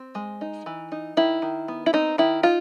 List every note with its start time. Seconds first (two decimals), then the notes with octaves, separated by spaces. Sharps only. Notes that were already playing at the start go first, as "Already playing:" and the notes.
Already playing: C4
0.15 G#3
0.41 D#4
0.66 E3
0.92 D#4
1.17 D#3 E4
1.42 D#3
1.68 B3
1.86 E4
1.93 C4 D#4
2.18 D#3 E4
2.43 D#4 F4